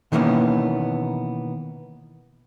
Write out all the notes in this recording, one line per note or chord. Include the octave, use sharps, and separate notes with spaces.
B2 D#3 E3 A#3 B3 C#4